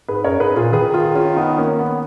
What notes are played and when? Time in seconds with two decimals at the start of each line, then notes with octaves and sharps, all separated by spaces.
0.08 G#2 G#4 B4
0.24 F#2 A#4 C#5
0.40 G#2 G#4 B4
0.56 A#2 F4 G#4
0.72 D#3 G#4 B4
0.94 F4 G#4
1.15 C#4 F4
1.36 B3 D#4
1.58 A#3 C#4
1.79 B3